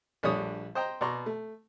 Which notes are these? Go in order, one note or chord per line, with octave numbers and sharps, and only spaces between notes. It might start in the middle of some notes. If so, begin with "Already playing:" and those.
A#1 G3 A3 D4 C#5 D#6
C5 D#5 G5 A#5
B2 D5 A#5 C6 C#6
A3